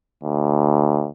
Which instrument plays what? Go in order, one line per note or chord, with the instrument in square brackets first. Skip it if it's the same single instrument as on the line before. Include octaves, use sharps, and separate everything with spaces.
[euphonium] D2